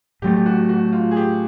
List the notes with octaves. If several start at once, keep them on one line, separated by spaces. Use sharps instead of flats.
A2 F#3 A3 G4
G4
F#4
F#4
F4
G#4
G4